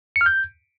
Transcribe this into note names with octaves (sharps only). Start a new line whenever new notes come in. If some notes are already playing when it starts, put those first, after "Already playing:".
C#7
F6
G6